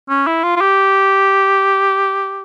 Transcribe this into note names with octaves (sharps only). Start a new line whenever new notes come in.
C#4
E4
F4
F4
G4